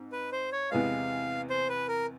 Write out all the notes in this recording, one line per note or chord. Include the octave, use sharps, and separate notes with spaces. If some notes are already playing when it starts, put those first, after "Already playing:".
Already playing: G#2 C4
B4
C5
C#5
E2 C3 E3 G#3 B3 F5
C5
B4
A#4